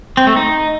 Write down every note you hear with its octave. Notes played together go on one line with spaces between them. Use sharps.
C4
A3
D#4